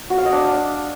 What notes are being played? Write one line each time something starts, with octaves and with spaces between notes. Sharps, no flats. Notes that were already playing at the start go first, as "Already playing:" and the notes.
F#4
F5
D#5
D4